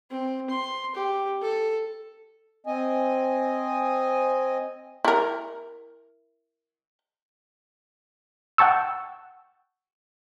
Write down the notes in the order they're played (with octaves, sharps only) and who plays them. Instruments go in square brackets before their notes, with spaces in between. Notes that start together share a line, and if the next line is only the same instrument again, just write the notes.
[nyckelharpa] C4
C6
G4
A4
[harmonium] C4 D#5 G#5
[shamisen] E4 A#4
[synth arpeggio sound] F#5 G5 A5 C#6 E6